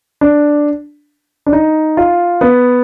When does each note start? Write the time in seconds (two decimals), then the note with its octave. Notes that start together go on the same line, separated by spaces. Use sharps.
0.21 D4
1.46 D4
1.53 D#4
1.97 F4
2.41 B3